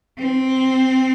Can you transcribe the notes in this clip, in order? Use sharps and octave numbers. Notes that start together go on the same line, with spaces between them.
C4